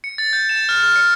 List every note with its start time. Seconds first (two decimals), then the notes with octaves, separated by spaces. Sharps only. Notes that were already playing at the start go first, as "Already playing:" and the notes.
0.04 C#7
0.18 A6
0.33 G6
0.49 E7
0.69 F6
0.83 F6
0.96 C#7